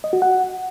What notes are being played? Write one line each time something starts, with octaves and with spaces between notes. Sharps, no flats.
D#5
F#4
F#5